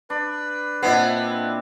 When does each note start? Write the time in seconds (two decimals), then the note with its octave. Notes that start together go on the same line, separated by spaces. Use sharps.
0.10 D4 B4
0.83 A#2 B3 C4 D4 E4 D#5 C7